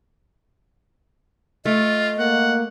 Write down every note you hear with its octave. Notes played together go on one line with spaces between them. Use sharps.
A3 F4 D#5
A#3 F#5